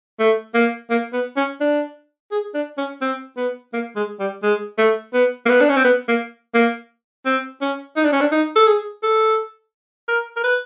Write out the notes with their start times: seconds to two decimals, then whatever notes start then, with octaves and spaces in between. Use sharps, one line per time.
0.19 A3
0.54 A#3
0.90 A#3
1.13 B3
1.37 C#4
1.60 D4
2.31 G#4
2.54 D4
2.78 C#4
3.01 C4
3.37 B3
3.73 A#3
3.96 G#3
4.20 G3
4.43 G#3
4.78 A3
5.14 B3
5.45 A#3
5.49 B3
5.61 D4
5.69 C#4
5.77 C4
5.84 B3
6.08 A#3
6.54 A#3
7.26 C4
7.61 C#4
7.96 D#4
8.05 D4
8.12 C#4
8.21 D4
8.32 D#4
8.56 A4
8.67 G#4
9.03 A4
10.08 A#4
10.36 A#4
10.44 B4